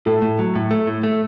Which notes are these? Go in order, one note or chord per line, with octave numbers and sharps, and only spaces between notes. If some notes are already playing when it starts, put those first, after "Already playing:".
A2 A4
A2
F#3
A2
A3
A2
A3